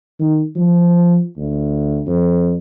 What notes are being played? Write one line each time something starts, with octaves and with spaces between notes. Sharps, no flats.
D#3
F3
D2
F2